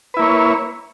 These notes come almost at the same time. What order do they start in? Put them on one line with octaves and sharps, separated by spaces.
B4 E4 A#3 C#5